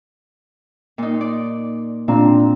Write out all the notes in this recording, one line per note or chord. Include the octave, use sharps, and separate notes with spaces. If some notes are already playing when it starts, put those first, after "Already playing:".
A#2 D#4
D5
A#2 C4 D4 A#5